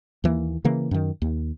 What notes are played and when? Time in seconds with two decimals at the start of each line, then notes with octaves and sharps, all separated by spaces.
0.24 D#2 E3 G3 A#3
0.65 C#3 E3 A#3
0.91 F#2 D#3
1.22 D#2